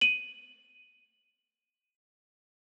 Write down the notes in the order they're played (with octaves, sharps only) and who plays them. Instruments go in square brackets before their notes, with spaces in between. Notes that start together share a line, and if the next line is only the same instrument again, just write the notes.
[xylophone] D#7 F#7